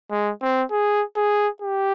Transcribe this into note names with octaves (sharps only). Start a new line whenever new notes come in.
G#3
C4
G#4
G#4
G4